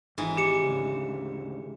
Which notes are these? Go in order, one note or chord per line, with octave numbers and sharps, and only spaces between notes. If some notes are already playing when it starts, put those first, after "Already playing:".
G#1 G#2 E3
G4 C#7 E7
D2 C#3